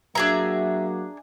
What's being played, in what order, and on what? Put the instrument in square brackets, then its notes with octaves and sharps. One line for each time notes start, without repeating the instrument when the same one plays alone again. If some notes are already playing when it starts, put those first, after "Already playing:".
[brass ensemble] F#3 A#3 F#4 [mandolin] D4 G#4 A#5 [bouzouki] E5